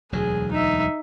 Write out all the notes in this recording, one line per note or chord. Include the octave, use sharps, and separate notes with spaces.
E1 D2 F#3 G#4
D#4 E5